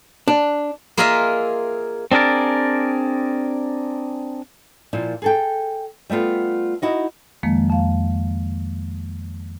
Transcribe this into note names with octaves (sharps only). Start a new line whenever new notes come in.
D4
A#3 F4 G#4 A#4 D#5 E5
C4 D4 G#4 A#4 D5
A#2 F3 E4 A#4
G#4 A4 G5
G3 A3 B3 F4
D#4 E4 F#4 D#5
F2 D#3 F3 G#3 A#3
F2 F5